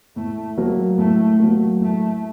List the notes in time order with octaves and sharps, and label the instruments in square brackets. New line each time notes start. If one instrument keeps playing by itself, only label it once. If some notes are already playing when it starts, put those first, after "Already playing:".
[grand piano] A2 [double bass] A3
[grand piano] F#3 A#3
[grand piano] A2 [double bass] A3
[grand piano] F#3 A#3
[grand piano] A2 [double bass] A3